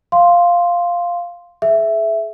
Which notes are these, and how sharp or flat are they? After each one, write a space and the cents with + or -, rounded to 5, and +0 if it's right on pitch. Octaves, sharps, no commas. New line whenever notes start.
F5 +0 C6 +0
G#4 +35 E5 +5